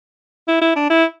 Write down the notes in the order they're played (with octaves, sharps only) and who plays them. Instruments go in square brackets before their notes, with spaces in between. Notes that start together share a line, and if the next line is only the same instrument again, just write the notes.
[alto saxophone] E4
E4
D4
E4